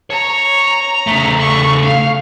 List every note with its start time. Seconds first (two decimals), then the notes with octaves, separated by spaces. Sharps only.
0.10 C#5 A#5
1.07 C#3 A3
1.38 C#6
1.82 F5